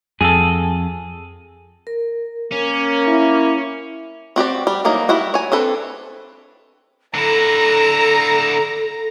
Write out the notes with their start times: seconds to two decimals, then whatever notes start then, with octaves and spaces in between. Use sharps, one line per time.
0.21 F2 G#4 A4
1.87 A#4
2.52 A#3 C#4
3.08 E4
4.36 C4 F#4 G4 D5
4.67 G3
4.85 E3 F#3 A#3 D#4
5.09 G3 E4 F#4 F#5
5.34 C#5 G#5
5.52 C4 D4 A4 B4
7.15 D3 E4 A4 A#5